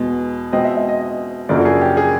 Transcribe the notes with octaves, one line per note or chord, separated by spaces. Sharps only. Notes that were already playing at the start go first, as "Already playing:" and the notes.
Already playing: E2 B2 G#3
B2 G#3 C4 D#5
E5
E5
D#5
D#5
F#2 C#3 F3 A#3 D4 D5
A4
G#4
G4
G#4